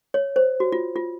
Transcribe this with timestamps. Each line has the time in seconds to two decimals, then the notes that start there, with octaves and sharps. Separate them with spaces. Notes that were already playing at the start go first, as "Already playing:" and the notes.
0.14 C#5
0.36 C5
0.60 F#4
0.72 F4
0.96 F4